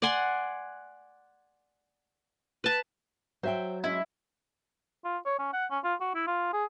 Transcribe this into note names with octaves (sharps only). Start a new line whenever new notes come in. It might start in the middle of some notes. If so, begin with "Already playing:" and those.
D5 F#5 G#5 C6
B4 A5
F#3 C5 E5 G5
G#3 C#4 E4
F4
C#5
C#4
F#5
C#4
F4
F#4
E4
F4
G#4